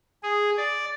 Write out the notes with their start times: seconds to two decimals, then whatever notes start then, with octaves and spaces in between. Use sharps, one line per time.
0.23 G#4
0.57 D5